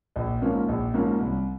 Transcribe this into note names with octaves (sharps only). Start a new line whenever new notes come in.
A#1
G#2 F3 A#3 C#4
A#1
G#2 F3 A#3 C#4
C2